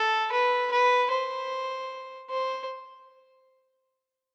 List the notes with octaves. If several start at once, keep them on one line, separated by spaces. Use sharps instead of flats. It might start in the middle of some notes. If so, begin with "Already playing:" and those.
Already playing: A4
B4
B4
C5
C5